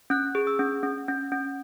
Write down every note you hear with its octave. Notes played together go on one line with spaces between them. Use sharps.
C#4 F#6
G#4
E6
C#4
C#4
C#4
C#4